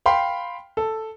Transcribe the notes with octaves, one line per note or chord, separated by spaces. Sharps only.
F5 G5 B5 C6
A4